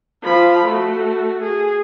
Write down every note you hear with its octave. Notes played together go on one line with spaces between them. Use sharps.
F3 B5
A3 F#4
G#4